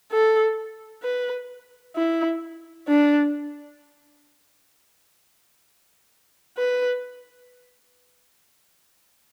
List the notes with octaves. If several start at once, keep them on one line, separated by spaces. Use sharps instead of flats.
A4
B4
E4
D4
B4